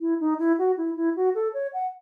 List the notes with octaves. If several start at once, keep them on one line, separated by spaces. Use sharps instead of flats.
E4
D#4
E4
F#4
E4
E4
F#4
A4
C#5
F#5